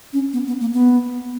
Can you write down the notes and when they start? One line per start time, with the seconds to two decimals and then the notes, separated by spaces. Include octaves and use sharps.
0.13 C#4
0.33 B3
0.47 B3
0.60 A#3
0.73 B3